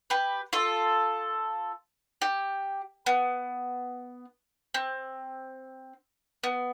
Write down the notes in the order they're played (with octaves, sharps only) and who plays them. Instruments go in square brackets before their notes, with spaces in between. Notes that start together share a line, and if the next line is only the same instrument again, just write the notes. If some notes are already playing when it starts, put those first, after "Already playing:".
[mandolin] G4 B4
F4 A4
G4
B3
C4
B3